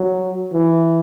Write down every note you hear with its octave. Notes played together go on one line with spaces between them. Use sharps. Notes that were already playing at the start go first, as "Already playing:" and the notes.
Already playing: F#3
E3